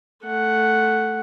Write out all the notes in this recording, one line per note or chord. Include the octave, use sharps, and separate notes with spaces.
A3 F#5